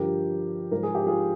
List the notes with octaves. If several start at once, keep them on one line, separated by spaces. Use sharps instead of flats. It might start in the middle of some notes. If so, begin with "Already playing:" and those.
Already playing: G2 D3 F3 G4 A#4
G#2 F3 A#4
G#4
G4
F4 G#4